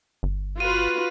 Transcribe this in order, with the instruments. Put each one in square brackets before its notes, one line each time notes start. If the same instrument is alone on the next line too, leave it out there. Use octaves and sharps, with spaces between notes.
[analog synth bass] G1
[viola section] F4 F#4 B4 [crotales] D#7